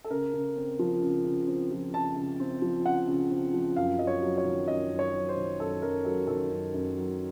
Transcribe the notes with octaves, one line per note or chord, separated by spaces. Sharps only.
A4
C#3 A#4
C#3
C4
F3
C#3
C#3
C4
F3
C#3 A5
C#3
C4
F3
C#3 F#5
C#3
C4
F3
F#2 F5
F#2 D#5
C#5
F#3
C#5
D#3
F#2 D#5
F#2
C#5
F#3
C5
D#3
F#2 A4
F#2 A#4
F#3 A4
D#3 A4
F#2
F#2
F#3